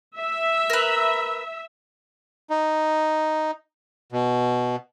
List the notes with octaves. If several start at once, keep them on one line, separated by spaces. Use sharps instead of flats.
E5
A#4 B4
D#4
B2